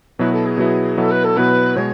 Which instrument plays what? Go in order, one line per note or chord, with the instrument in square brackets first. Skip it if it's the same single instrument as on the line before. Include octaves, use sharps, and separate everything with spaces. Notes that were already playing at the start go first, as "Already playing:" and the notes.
[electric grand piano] B2 F#3 B3 E4 [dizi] B4
[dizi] A4
G#4
[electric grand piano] B2 F#3 B3 E4
[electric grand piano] B2 F#3 B3 E4 [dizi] A4
[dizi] B4
A4
[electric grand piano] B2 F#3 B3 E4 [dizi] B4
[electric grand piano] B2 G#3 [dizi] C#5